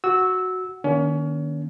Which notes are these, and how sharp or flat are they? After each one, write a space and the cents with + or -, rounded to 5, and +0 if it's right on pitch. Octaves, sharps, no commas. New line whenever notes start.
F#4 +0 E6 -15
D#3 -25 A#3 +30 C#4 +30